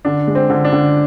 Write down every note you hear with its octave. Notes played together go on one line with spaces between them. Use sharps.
D3 D4
G#3
C4
D3
D4
D3